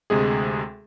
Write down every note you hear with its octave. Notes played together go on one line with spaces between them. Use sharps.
D2 C3 G#3 G#4